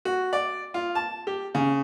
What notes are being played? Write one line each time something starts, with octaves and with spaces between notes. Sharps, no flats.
F#4
D5
F4
A5
G4
C#3